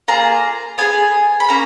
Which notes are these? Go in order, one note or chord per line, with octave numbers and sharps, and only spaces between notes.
A#3 F4 G#4 A#5
B3 D#4 G#4 G#5
B5
A#3 C#4 A#5